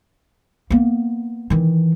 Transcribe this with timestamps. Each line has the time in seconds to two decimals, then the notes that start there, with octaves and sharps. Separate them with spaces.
0.70 A#3 B3
1.50 D#3 E3